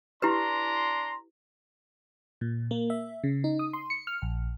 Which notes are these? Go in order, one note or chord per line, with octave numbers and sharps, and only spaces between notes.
D4 E4 G4 B4 A#5 C6
A#2
A#3
E5
C#3
D#4
D#6
C6
C#7
F6
A#1